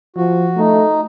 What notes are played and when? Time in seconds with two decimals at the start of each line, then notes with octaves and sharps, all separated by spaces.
0.16 F3 F#4
0.57 A3 D#4